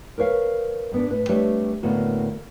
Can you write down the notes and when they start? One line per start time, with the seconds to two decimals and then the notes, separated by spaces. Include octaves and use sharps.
0.18 A#4 B4 C#5 F5
0.92 G#2 B3 D4
1.10 A2 B4
1.29 G3 A3 C4 D4 B4 C#5
1.83 A2 D3 A#3 B3 F#4